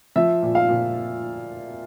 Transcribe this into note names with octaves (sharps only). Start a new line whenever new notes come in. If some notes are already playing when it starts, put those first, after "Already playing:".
F3 E5
A#2
F5
A#2